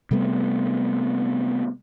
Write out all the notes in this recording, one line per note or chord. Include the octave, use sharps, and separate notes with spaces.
C3 G3 A3 B3